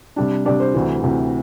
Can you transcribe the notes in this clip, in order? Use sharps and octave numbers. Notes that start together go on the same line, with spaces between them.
C3 G3 D4
C3 G3 D4 D5
C5
D2 C3 E3
D2 C3 E3